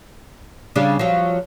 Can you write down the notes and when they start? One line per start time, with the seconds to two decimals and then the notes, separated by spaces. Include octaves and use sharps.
0.76 C#3 G3 D4
0.99 F3 F#3